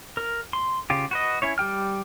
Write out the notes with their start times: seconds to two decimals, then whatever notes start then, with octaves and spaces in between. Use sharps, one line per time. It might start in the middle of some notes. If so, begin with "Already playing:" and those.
0.17 A#4
0.53 C6
0.90 C#3 F4 G4
1.11 F#4 B4 D#5
1.42 C#4 E4 C#5
1.58 G3 G4 G5 F6